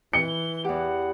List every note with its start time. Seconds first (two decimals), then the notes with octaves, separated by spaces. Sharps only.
0.13 E3 C#7 G7
0.64 E2 G4 F#5